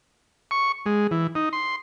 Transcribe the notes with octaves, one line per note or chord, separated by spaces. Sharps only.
C#6
G#3
E3
D#4
C6